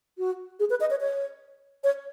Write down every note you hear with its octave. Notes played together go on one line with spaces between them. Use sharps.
F#4
G#4
B4
D#5
C#5
C#5
C#5